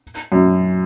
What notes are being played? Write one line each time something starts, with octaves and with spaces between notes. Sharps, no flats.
F#2